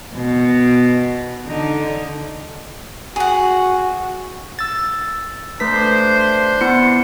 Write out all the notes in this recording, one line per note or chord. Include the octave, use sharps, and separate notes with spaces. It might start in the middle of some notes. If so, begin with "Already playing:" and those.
B2
D3 D#4
F#4 G#4 F#5
E6 A6
A3 D4 B4 C5 B6
B3 E4 C#7